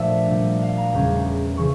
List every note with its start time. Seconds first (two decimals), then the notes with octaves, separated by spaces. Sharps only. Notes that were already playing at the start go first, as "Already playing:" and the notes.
Already playing: A#2 F3 A3 D4 D5 E5
0.30 A#2 G3 D4
0.62 F5
0.78 A#5
0.93 E2 C#3 G3 C#4 E4
1.57 C#3 E3 C#6